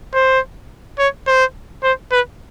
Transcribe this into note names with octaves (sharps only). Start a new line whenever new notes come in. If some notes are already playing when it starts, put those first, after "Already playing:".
C5
C#5
C5
C5
B4